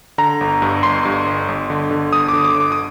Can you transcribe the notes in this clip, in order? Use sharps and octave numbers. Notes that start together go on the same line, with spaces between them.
D3 A#5
G1
G2
G1 C6
G2
G1
G1
D3
D3
G1 D#6
D3 D6
D6
G1 D6
D#6